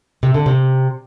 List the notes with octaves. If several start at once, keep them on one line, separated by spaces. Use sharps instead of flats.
C3
D3
C3